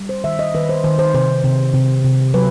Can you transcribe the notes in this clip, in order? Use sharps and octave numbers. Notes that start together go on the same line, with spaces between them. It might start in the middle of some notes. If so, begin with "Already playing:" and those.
Already playing: G3
C5
D#3 E5
D#5
D#3 B4
C5
D#3 C5
C5
C3 C5
C3
C3
C3
F#3 B4